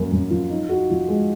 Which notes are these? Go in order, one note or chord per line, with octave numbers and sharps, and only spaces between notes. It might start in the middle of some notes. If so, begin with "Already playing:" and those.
Already playing: F#2 A#3
F#2
F3
D#4
F#4
F3
G#3